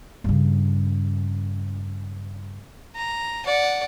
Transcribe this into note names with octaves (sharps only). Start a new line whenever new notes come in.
G2 C#3
A#5
D5 F#5